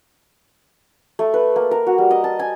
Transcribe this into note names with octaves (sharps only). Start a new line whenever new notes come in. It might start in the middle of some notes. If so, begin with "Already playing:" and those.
A3
B4
A#3
A#4
F#4
G3
D#5
A5
G#5